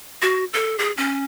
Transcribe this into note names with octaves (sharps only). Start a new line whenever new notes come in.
F#4
A4
G#4
C#4